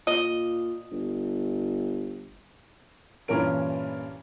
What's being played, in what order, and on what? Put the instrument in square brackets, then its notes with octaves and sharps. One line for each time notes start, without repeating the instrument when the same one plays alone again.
[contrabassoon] A#2 [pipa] D#5
[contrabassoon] G1
[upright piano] G2 A#2 E3 C#4 A#4 D7